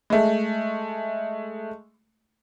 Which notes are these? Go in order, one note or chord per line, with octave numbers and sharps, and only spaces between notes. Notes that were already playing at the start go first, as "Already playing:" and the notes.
G#3 A3